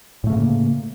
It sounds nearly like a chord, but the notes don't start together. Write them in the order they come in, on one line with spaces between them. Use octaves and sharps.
A2 A3 C#3 A#3